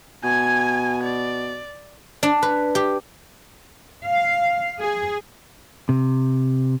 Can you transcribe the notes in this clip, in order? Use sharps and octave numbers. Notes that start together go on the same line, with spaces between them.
B2 G#5 G#6
D5
D4
B4
G4
F5
G#4
C3